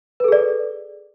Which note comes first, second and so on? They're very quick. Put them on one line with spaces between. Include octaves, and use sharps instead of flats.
B4 A4 G#4 D5